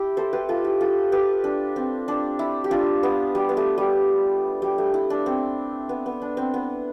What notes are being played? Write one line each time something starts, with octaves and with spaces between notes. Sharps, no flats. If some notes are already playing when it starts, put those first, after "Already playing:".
Already playing: E4 G4
A4 C5
G4 B4
F4 A4
E4 G4
F4 A4
G4 B4
D4
C4
D4
E4
G4
D4 F4
B3
G3
B3
A3
G3
G3
A3
E4
D4
C4
B3
B3
D4
C4
B3